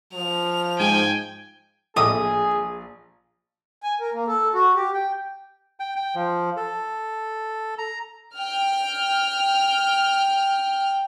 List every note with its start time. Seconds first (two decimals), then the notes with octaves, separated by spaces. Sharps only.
0.13 F3 F7
0.80 G#2 G5 G#5
1.97 A#1 A2 G#4 D#5 E5 D#6
3.83 G#5
4.00 A#4
4.14 A#3
4.28 A4
4.54 F#4
4.75 G4
4.94 G5
5.80 G5
5.96 G5
6.15 F3
6.57 A4
7.78 A#5
8.35 G5 F6